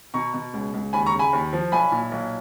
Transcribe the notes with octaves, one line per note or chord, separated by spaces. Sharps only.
B2 A#5 C#6
B2
C#2
C#2
D#2 G#5 B5
A#5 C#6
C#3
G#5 B5
D#2
F3
B1 G#5 B5
A#2
B1